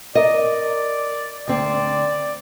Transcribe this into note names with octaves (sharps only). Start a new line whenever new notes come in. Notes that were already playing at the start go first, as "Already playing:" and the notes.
A#4 D5 D#5
D2 C4 D5